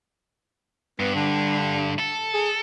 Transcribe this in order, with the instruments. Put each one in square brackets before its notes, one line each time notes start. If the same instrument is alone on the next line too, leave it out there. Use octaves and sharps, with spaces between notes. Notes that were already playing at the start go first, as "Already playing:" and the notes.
[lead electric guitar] G2 [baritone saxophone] B3
[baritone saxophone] D3
[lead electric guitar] A4
[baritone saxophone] G#4